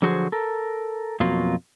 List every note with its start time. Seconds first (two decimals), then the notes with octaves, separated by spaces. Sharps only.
0.02 D3 F3 F#3 F#4 G#4 C5
0.32 A4 A#4
1.20 F2 B2 F#3 A#3 F4